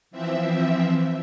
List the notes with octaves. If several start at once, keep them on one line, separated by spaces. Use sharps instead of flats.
E3 F3 C4 E5